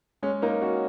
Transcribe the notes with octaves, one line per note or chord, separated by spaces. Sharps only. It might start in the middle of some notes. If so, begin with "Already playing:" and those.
G#3 C#4
A#3 D#4
C#4 F#4